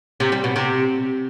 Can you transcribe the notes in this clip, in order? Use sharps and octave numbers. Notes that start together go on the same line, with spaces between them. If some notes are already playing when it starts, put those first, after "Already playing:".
C3
G3
B2
C3